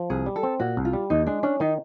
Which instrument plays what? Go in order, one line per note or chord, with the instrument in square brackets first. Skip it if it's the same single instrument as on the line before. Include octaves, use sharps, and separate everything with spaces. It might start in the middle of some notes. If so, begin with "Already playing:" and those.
Already playing: [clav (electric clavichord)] F3
[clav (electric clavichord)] C2 [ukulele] G#4
[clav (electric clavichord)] G3
[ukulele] A4
[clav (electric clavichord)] C4
[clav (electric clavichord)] A#2 [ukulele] F#4
[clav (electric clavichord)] C2
[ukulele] F4
[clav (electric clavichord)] G3
[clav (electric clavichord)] D#2 [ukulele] D#4
[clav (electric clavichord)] G#3 [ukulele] D4
[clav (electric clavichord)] C#4 [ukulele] D4
[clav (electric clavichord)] D#3 [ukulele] D#4